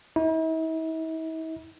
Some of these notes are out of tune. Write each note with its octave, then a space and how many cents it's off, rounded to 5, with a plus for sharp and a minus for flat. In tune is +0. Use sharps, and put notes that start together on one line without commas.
E4 -45